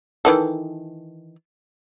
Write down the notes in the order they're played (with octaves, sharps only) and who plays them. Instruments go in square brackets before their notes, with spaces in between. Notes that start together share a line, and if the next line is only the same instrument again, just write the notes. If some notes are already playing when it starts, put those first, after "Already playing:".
[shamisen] D#3 E3 A4